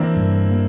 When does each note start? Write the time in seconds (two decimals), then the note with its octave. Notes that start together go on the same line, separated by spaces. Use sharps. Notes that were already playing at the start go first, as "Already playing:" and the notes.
Already playing: E3 A#3 C4 D4 E4
0.16 G2
0.51 A#3